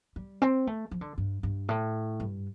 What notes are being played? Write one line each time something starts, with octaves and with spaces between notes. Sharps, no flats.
G3
C4
A3
F3
D3
G2
G2
A2
G2